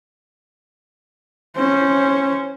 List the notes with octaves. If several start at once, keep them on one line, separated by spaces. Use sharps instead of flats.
C#4 C5